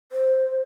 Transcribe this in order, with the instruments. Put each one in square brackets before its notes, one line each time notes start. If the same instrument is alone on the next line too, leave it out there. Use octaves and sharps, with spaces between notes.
[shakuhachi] C5